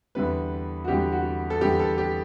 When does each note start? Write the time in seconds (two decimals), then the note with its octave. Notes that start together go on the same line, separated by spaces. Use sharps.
0.15 E2 D3 G3 B4
0.84 F#4
0.88 E2 D3 G3 G4
1.12 F#4
1.50 A4
1.61 E2 D3 G3 G4
1.79 A4
1.98 G4